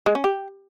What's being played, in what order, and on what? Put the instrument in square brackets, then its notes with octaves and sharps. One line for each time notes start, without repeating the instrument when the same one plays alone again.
[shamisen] G#3
C#4
G4